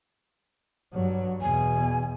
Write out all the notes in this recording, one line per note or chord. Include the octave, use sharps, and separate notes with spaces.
G2 F#3
E2 B2 G#5